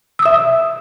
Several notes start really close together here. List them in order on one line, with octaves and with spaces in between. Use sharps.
E6 D#6 E5